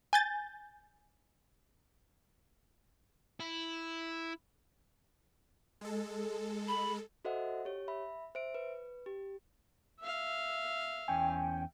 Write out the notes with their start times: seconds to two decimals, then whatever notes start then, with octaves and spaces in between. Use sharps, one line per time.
0.13 G#5 G6 A6
3.40 E4
5.81 G#3 A4
6.68 B5
7.25 F#4 A4 C5 D#5 E5 F#5
7.65 G4 C#5
7.88 E5 B5
8.35 C5 E5 D7
8.54 B4
9.06 G4
10.00 E5 F5
11.08 E2 C#4 G5 G#5